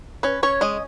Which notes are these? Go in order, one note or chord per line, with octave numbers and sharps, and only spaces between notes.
C#4 B4
C#4 C#5
G#3 D#5